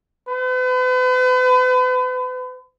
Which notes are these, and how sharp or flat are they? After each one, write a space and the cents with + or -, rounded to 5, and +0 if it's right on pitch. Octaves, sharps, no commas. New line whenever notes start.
B4 +40